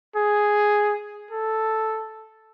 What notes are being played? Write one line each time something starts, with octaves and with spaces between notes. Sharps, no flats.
G#4
A4